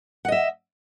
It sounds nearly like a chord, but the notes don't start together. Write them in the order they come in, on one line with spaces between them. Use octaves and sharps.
F#5 D#5 E5